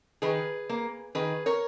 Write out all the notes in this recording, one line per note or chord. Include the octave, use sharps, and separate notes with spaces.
D#3 G#4 B4
A#3
D#3 G#4 B4
A#4 C#5